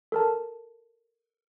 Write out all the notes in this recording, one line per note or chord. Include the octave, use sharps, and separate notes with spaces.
A4 A#4 A5